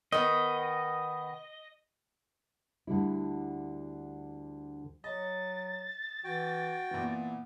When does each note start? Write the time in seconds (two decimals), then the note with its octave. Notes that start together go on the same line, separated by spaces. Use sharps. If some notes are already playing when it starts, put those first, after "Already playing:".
0.12 D#3 B3 D#5
2.87 D2 D3 G3 E4
5.04 F#3 D#5 A6
6.24 E3 F#4 G5
6.91 A#2 E3 B3